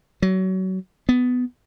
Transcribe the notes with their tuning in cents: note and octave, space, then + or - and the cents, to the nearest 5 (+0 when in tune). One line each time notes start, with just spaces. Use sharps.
F#3 +25
B3 +10